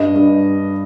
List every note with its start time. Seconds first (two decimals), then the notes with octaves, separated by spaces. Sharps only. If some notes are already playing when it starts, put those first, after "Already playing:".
Already playing: G2 D#5
0.16 G2